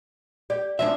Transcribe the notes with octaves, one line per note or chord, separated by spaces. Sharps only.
G4 D5
F3 C#4 D4 E5